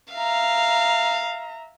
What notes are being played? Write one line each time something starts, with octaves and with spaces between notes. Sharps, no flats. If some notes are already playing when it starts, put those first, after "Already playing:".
E5 F5 A#5